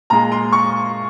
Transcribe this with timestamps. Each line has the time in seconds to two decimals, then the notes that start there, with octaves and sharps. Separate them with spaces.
0.10 A#2 G#3 A#5
0.32 C6
0.52 C#6